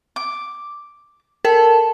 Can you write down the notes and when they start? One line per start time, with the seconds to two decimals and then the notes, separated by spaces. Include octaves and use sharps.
0.16 D6
1.45 A4 A#4